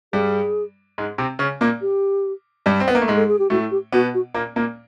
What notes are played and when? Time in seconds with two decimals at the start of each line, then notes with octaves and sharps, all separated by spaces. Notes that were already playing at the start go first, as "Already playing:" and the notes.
0.13 G2 G3 G#4
0.98 G#2 G#3
1.18 C3 C4
1.39 C#3 C#4
1.61 A#2 A#3
1.81 G4
2.66 G2 G3
2.80 C4
2.88 B3
2.95 A#3
3.02 A3
3.08 G#2 G#3
3.16 A4
3.28 G#4
3.39 G4
3.50 A2 A3 F#4
3.71 G4
3.92 B2 B3 F#4
4.14 F#4
4.34 A#2 A#3
4.56 A#2 A#3